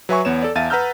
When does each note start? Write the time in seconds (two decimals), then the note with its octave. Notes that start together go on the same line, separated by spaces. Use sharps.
0.09 F#3 B4 E5 G#5 C#6
0.25 E2 B3 C#5 E7
0.42 A4 D5
0.55 E2 E5 F5 A5 A6 D#7
0.70 B4 F#5 A#5 E6 F6 G6